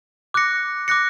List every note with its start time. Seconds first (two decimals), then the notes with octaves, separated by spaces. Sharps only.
0.34 D6 F#6 A#6 C#7
0.88 D6 F#6 A#6 C#7